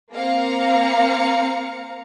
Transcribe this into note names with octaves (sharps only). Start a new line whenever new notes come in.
A#3 C4 F5 A#5 C#7